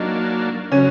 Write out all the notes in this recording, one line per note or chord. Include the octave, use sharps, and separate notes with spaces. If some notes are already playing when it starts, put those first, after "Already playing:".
Already playing: F#3 A#3 D4 D#4
C#3 F#3 C#4